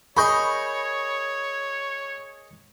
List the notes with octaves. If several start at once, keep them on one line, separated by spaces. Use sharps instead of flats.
G#4 A#4 C#5 D#5 B5 C#6 G6